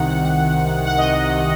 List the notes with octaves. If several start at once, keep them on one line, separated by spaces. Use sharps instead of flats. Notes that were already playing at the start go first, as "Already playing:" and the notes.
Already playing: C2 C3 D#3 F#5
F#5
D#5